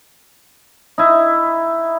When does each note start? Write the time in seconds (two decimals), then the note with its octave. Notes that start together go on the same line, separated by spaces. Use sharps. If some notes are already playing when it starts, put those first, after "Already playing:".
0.98 D#4 E4